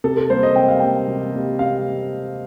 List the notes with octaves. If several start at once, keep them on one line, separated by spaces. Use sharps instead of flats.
C3 A4
A4
G3 A#3 C5
D#5
C3 G5
F5
G3 A#3 G5
C3
G3 A#3
C3 F5